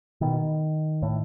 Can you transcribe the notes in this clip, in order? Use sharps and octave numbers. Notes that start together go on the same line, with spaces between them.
B2 D#3
A2